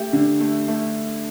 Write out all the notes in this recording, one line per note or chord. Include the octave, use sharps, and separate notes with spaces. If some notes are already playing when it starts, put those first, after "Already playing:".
Already playing: A3 G4
D3
A3
A3